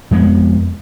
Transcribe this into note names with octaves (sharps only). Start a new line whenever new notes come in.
F2 G#3 B3